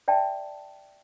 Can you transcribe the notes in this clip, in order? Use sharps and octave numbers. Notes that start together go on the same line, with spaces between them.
D5 E5 G5 A5